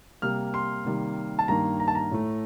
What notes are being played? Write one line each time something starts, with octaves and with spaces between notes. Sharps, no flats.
C3 G3 A#3 F6
C6
C3 D#3 G3 A#3
A5
G2 D#3 G3 A#3 A#5
A#5
A5
A#5
A2 A3